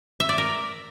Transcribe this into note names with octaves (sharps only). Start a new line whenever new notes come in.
E5
D5
A#4